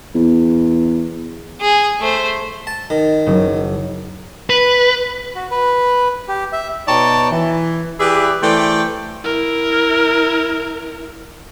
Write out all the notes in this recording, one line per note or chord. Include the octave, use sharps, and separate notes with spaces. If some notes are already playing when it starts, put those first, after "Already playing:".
E2
G#4
A3 C5
A5
D#3
F#1 C#3
B4
F#4
B4
G4
E5
B2 D#4 C#5 D5 G5 A5
E3
E4 G4 G#4 B4 D5 E5
E3 A3 C5 D5 G5
E4 A#4